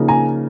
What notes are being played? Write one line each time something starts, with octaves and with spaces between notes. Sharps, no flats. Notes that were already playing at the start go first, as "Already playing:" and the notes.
Already playing: C#3 F3 A#3 D#4
G#5 A#5